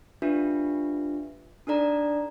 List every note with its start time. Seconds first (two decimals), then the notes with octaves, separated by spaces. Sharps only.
0.22 D4 F4 G4 B4 E5
1.67 D4 D#4 A4 D5 A#5